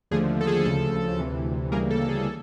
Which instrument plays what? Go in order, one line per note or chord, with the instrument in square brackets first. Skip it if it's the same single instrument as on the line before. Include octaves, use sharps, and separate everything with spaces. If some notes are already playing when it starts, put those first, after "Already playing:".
[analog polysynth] D#2 D3 F3 A3 G#4
A4
G#4
D2 C#3 F3 A4
D2 C3 E3
D2 C#3 E3 G3 A#3 G#4 A#4
A4
G#4
A4